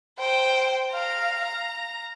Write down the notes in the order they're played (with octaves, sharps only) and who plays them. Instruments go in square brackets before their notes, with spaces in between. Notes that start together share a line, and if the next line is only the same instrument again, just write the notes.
[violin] C5 [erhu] G5
[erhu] F5 [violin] A#5